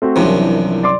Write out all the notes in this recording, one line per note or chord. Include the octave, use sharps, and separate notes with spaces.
A3 C4 F#4
C2 F#2 C3 E3 F3 D4
D5 C6 D6